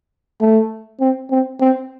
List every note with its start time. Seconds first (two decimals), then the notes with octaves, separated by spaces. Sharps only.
0.41 A3
1.01 C4
1.31 C4
1.61 C4